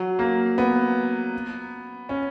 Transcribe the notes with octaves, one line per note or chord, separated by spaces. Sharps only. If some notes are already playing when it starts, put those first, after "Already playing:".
Already playing: F#3
A#3
B3
C#4